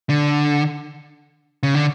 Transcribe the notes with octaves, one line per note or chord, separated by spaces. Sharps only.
D3
C#3
D3